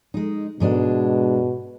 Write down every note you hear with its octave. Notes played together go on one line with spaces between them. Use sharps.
G#3 D#4
G#2 B2 G#3 D4